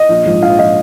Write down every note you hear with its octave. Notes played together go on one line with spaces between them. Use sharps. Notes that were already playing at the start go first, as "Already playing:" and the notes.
Already playing: D#5
A#1
G#2 F3
A#1 F5
F3 D#5